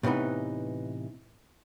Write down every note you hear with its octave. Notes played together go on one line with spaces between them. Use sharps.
A2 C3 E3 B3 D#4